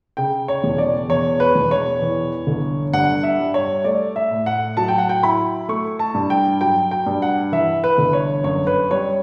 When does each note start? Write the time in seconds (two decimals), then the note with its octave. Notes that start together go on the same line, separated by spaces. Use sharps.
0.17 C#3 G5
0.48 C#5
0.64 E1
0.78 D5
1.09 E2 C#5
1.40 B4
1.55 E1
1.71 C#5
2.02 E3
2.47 G1
2.93 G2 F#5
3.23 E5
3.39 G3
3.54 C#5
3.84 A3 D5
4.16 E5
4.31 A2
4.46 F#5
4.77 F#3 A5
4.88 G5
4.98 F#5
5.09 G5
5.23 E4 B5
5.69 A3 C#6
5.99 A5
6.14 G2
6.30 G5
6.61 F#3 G5
6.91 G5
7.06 G2
7.22 F#5
7.52 E3 E5
7.84 B4
7.98 G1
8.13 C#5
8.44 F#2 C#5
8.67 B4
8.91 G3 C#5